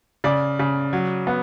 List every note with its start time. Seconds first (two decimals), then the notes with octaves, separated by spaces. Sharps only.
0.24 C#3 D5
0.59 C#3
0.93 F#3
1.27 B3